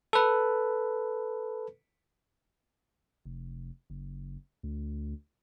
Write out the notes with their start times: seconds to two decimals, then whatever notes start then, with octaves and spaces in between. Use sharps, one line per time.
0.13 A4 B4
3.25 F1
3.90 F#1
4.63 D2